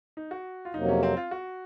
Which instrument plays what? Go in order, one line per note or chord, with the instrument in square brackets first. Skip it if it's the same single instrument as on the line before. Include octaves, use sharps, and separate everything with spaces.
[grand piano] D#4
F#4
F4
[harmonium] F2 C3 F#3 A#3 [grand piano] D#4
[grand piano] C#4
C4
F4
F#4